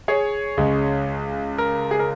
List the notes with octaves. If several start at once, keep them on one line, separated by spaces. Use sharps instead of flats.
G#4 C#5
C#2 C#3 G#3
A#4
G#4
A#4